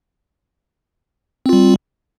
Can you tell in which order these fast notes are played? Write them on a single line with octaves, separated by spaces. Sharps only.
C4 F4 G3